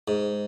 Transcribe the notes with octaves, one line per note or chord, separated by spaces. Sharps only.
G#2